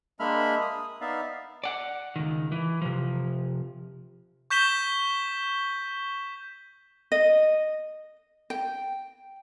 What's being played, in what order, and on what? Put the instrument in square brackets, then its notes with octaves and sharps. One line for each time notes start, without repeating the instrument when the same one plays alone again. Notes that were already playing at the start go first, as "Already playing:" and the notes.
[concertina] G#3 A#3 D4 E5 B5 F6
D#6
B3 D#4 D5 E5 F5
[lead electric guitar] D5 F#5
C#2 D#3
E3
C3 F3
[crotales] C#6 G6 B6 E7 G7
[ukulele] D#5
G5